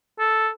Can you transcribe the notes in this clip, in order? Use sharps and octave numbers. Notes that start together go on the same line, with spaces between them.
A4